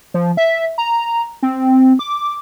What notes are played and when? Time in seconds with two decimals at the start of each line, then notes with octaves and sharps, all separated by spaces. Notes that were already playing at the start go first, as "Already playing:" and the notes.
0.14 F3
0.37 E5
0.78 A#5
1.43 C4
1.99 D6